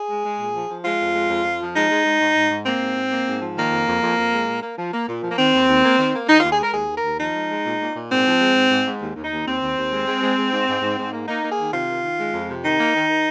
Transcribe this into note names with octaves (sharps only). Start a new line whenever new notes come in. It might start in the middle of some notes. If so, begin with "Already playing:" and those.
Already playing: G#4
G#3
G#3
A#2
F3
F3
G#3 F4
F2
G#3
F2
F2
F3
G#3 D#4
G#3
G#3
G#2
G#2
G#2
A#3 C4
G#2
G#2
A#3
G#2
F3
D#3 A#3
F2
F2
F2
F2
G#3
A#2
A#3
F3
A#3
A#2
F3
A#3
D#3 C4
D#2
D#2
A#3
D#3
A#3
D#3 D#4
D#2 F4
G#4
G#3 A#4
D#2 G#4
D#3
A#4
D#2
F3 D#4
G#3
G#3
A#2
A#2
A#2
G#2 C4
F3
G#3
G#2
G#2
G#2
D#2
D#2
D#4
D#2
D#2 C4
D#2
D#2
G#3
G#3
G#3
G#3
G#2
G#2
G#2
G#2
A#3
A#3 D#4
A#3
G#4
D#3
C3 F4
D#3
D#3
G#3
F2
C3
D#3 D#4
A#3
D#3
D#3